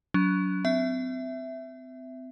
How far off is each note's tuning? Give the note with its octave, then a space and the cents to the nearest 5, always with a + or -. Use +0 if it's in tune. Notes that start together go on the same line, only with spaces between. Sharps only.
F#3 +0 D4 -40
C4 -35 E5 +0